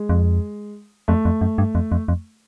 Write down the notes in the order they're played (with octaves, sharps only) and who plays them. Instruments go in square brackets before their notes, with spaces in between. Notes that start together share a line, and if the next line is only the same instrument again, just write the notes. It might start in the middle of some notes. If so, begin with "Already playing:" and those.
Already playing: [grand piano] G#3
[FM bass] F2
[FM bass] F2 [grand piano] A3
[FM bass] F2
F#2
G2
F2
F2
F2